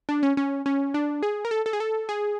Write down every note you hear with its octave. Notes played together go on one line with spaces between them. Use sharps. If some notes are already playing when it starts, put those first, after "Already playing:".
D4
C#4
C#4
C#4
D4
G#4
A#4
A4
A4
G#4
A4
G#4